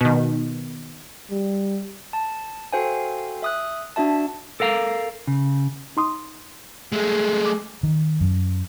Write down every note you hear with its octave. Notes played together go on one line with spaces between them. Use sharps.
B2 D#3
G3
A5
F#4 A4 C5 F5 G5 G#5
E5 D#6 F#6
D4 F#4 E5 A5
A4 A#4 F5 A#5
C#3
D#4 C6 D#6
G#3 A3
D6
D#3
F#2